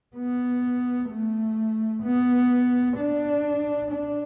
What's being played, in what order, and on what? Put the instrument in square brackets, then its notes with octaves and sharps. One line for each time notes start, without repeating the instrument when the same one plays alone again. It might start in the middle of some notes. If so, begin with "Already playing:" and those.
[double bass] B3
A3
B3
D4
D4